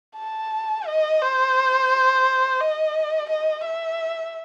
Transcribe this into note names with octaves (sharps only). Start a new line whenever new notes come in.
A5
D#5
C5
D#5
D#5
E5